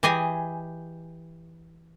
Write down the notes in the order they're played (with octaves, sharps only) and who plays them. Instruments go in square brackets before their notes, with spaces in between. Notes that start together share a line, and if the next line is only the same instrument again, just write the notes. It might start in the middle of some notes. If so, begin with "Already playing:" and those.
[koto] E3 G4 G#4 D#5 G#5